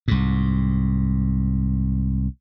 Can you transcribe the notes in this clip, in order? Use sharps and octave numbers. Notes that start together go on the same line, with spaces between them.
C2 G#2